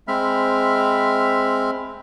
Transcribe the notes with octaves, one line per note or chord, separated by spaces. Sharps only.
G#3 C4 E5 B5 F6